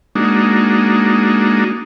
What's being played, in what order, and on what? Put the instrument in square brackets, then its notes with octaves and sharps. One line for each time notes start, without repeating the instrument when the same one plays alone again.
[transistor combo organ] G#3 A#3 D4 D#4 F#4